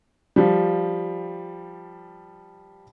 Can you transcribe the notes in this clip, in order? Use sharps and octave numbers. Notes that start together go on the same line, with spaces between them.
F3 G3